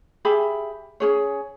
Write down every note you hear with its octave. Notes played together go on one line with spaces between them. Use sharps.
G4 G#4 E5 B5
C#4 G#4 C#5